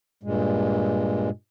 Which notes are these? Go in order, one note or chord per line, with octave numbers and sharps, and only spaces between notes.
G2 A#2 G#3